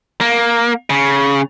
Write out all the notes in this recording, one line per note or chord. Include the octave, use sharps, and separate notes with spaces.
A#3
C#3